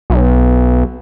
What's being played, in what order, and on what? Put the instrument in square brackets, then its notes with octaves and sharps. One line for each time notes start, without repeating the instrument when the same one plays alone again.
[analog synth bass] B1